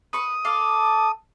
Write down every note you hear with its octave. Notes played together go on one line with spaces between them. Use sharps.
B4 C#6 D#6
A4 F5 D6